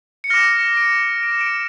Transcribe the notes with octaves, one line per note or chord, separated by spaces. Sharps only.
C#7
D6 F6 A#6
C#7
D7
D7
E7
D7